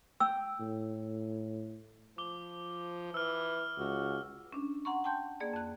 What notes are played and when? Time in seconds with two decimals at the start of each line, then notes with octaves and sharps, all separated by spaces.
0.20 G5 E6
0.59 A2
2.18 F3 D6 G7
3.14 E3 E6 F6
3.78 C#2 F#4
4.52 C#4 D4
4.85 F#5 A#5 C6 C#6
5.04 G5 A5 C6 G6
5.40 A#3 G#4 D5
5.53 F2 F#6